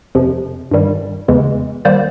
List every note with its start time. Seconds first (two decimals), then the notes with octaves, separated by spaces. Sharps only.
0.15 F2 C3 F3
0.71 G2 D#3 G3
1.28 E2 C#3 E3 G#3
1.85 D#3 G3 A#3 C5 D5